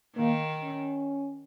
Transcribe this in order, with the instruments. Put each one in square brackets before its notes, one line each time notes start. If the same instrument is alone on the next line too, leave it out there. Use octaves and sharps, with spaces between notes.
[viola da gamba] D#3 [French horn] A#3
[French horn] C#4